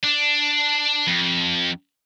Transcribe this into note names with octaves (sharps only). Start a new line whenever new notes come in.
D4
F2